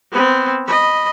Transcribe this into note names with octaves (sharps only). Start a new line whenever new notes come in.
B3 C4
D#5 B5